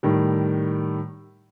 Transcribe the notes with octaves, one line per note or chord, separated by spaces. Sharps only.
A2 D#3 G3